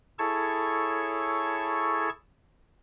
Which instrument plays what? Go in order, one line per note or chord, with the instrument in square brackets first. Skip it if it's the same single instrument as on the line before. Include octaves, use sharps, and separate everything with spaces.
[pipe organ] E4 G#4 A4 C#5 A5 C#6